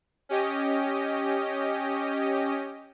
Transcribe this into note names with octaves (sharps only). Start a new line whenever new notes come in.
C#4 G4 D#5